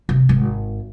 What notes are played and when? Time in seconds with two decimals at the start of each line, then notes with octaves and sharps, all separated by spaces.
0.09 C3
0.29 G#1